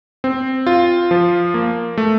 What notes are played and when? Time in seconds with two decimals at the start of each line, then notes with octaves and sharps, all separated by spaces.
0.24 C4
0.67 F4
1.11 F3
1.54 A#3
1.98 A3